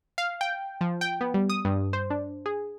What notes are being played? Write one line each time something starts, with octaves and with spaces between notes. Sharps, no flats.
F5
G5
F3
G5
B3
G3
D#6
G2
C5
D4
G#4